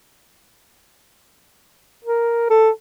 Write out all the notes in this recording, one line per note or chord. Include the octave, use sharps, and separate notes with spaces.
A#4
A4